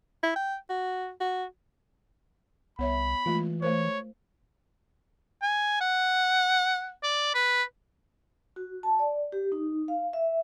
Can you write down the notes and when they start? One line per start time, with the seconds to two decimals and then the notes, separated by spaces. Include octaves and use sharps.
0.23 E4
0.36 G5
0.70 F#4
1.21 F#4
2.79 C2 B3 C#5 E5 B5
3.26 E3 G#3 A3 F4
3.62 A3 A#4 C5 C#5
5.42 G#5
5.81 F#5
7.03 D5
7.35 B4
8.56 F#4
8.83 A5
8.99 D5
9.32 G4
9.52 D#4
9.88 F5
10.13 E5